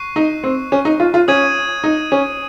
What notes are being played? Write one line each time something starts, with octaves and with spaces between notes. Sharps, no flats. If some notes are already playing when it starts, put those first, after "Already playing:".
Already playing: C#6 F#6 C7 D#7
D#4
C4
C#4
D#4
F4
F4
C#4 D#6 G#6 D#7
D#4
C#4